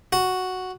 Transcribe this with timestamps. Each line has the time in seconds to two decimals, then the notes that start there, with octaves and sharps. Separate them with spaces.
0.13 F#4